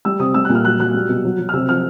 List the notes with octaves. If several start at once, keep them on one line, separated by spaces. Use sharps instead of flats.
G3 E6
C3 D#6
G3 E6
A#2 F#6
F6
F#3 F#6
F#3 F#6
G3
B2
F#3
F#3
F6
C3 E6
F3 F6